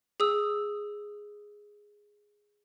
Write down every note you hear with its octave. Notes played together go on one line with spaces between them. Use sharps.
G#4 D#6 E6